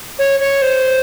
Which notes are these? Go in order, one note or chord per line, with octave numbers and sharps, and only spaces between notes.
C#5
C#5
C5